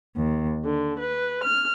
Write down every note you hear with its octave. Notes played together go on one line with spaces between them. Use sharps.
D#2
D3
B4
F6